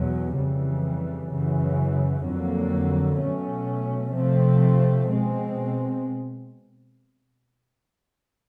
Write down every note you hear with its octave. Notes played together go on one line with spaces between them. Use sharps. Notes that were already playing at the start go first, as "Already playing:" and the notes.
Already playing: E2 B2 F#3
F2 C#3 E3 G3
F#2 C#3 E3
F2 D3 F#3 A#3
B2 F#3 A3 C#4
C3 F3 A3 C4
B2 G#3 C4